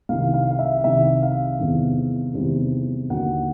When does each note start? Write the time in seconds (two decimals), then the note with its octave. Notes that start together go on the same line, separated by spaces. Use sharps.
0.09 C2 C3 D#3 F5
0.34 F5
0.51 F5
0.59 E5
0.84 C2 C3 D#3 E5
1.23 F5
1.59 E2 C3 D#3 G3
2.34 E2 C3 D#3 G3
3.10 D#2 D3 F#3 F#5